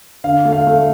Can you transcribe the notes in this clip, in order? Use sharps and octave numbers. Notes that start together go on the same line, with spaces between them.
D3 F5
A3
F5
A3